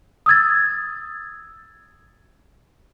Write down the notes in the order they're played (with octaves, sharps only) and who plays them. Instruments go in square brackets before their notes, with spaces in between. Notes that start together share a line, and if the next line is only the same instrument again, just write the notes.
[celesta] D#6 E6 G#6 A6